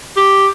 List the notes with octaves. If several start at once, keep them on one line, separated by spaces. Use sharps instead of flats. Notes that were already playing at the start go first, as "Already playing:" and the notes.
G4